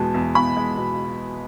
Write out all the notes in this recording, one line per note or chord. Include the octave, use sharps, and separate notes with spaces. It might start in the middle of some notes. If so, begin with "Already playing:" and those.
Already playing: E2 B2 G#3 A5
E2
E2 B5
G#3
B2